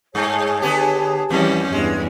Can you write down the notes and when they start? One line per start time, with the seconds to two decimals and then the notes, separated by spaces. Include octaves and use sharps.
0.15 G2 G#4 C#5 A5
0.62 D3 B3 G4
1.30 E2 E3 G3 C#4
1.73 E2 G2 G#3